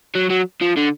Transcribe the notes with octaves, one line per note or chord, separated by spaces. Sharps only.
F#3
F#3
F3
D3